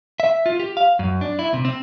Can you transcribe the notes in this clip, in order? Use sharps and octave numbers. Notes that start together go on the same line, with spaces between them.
E5
F4
G4
F5
F#2
D4
E4
C3
C4